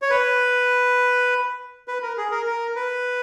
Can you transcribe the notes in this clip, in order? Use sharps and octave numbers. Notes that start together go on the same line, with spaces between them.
C#5
B4
B4
A#4
G#4
A#4
A#4
B4